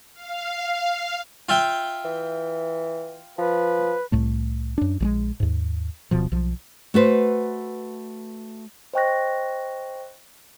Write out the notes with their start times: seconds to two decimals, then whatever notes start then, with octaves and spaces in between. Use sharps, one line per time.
0.14 F5
1.49 F4 E5 G5
2.05 E3
3.38 F3 B4
4.12 C2 A2 A3
4.78 F#2 D4
5.00 A#1 G3 G#3
5.40 D#2 G#2
6.11 D1 B2 F3
6.32 B1 F3
6.94 A3 F#4 B4 C5
8.94 C5 D#5 G5 C#6 F#6 A#6